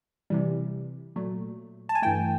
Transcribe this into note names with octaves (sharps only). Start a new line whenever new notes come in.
C3 E3 G3
A#2 F#3 A3
A5
G#5
G2 E3 A3 G5